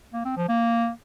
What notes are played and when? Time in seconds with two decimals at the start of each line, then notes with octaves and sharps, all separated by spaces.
0.13 A#3
0.25 C4
0.37 F3
0.49 A#3